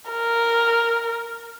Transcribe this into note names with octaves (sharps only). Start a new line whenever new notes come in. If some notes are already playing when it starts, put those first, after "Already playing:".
A#4